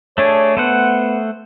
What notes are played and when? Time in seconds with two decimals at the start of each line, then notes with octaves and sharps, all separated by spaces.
0.18 A3 D4 G#4 C#5
0.57 A3 B3 C5 F#5